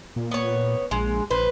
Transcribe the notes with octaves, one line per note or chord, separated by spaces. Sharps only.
A#2
B3 C#5
A#1 G#3
A#1 B4 C5